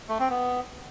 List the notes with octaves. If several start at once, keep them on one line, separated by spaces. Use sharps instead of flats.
A3
C4
B3